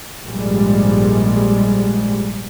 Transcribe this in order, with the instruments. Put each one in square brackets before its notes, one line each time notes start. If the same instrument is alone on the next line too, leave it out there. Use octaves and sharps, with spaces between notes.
[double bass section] A#1 G#2 G3 G#3